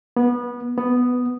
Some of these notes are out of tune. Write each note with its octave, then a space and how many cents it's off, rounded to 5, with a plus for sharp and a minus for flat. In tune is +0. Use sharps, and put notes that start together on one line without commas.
B3 -20
B3 +5